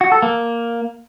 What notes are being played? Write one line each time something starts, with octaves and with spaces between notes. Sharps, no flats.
F#4
A4
A#3